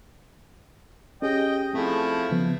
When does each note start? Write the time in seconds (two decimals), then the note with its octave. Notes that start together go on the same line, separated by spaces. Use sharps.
1.22 C#4 G4 G#4 D#5 G5
1.74 F3 A3 C4 E4 G#4
2.31 C#3 F3 B3